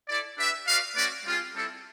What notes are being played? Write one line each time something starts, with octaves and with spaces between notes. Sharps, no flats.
E4 A4 D5
D4 G4 B4 E5
F#4 B4 D5 F5
A3 C#4 F#4 B4 D5
G3 C4 F4 G#4
G3 C4 E4 A4